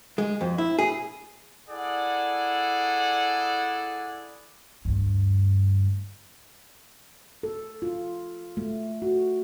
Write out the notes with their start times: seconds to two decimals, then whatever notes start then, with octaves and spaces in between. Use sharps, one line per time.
0.18 G#3
0.41 F2
0.58 E4
0.79 G#4
1.68 E4 G#4 A4 D5 F#5
4.85 D2 G2
7.43 A4
7.82 F4
8.57 A3
9.02 F#4